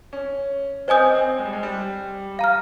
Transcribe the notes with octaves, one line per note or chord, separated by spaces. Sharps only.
C#4
C4 C5 D#5 G#5 D#6 G6
C4
G#3
G3
G#3
G3
F5 A#5 F6